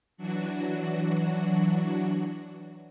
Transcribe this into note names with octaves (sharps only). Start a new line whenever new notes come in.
E3 F#3 D4 F#4